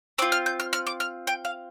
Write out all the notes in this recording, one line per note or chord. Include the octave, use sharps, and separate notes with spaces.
C4 F4 D6
F6
G6
F6
F6
D6
F6
G5
F5